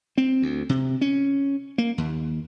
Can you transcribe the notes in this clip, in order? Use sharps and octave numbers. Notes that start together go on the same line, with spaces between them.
C4
D2
C3
C#4
A#3
D#2